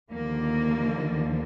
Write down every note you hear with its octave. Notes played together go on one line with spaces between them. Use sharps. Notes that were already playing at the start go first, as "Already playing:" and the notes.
D#2 D3 F3 A#3